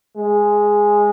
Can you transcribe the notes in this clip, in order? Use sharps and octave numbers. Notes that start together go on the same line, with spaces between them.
G#3